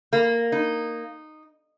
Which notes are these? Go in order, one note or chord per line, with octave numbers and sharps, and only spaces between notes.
A#3
D#4